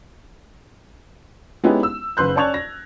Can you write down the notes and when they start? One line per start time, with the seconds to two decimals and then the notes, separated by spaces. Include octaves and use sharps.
1.64 G#3 B3 C#4 D#4 E4 G4
1.83 E6
2.17 F#1 B4 C6 F#6 G6
2.36 C#4 D5 A5 C#6 G#6 F7
2.54 A#6